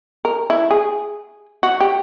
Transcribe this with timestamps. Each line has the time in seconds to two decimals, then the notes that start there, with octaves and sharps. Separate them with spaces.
0.25 A#4
0.50 E4
0.71 G#4
1.63 F#4
1.80 G4